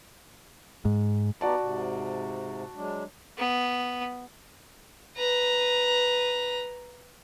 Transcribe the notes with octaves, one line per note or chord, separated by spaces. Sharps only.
G#2
B3 D#4 F#4 G4 D5 A5
G#2 C3
F#3 G#3 D4
B3
B4 A#5